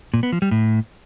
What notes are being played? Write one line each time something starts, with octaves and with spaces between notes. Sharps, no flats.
A#2
B3
F3
G3
A2